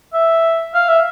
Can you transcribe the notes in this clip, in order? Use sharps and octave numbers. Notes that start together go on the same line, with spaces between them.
E5
F5
E5